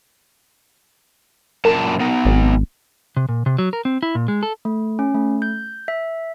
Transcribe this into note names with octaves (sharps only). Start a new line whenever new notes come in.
F#2 A#2 A#4 A5
B3 D#4
G#1
C3
A#2
C3
F#3
A#4
C4
E4
A#2
G#3
A4
A3
C#4
A3
G6
E5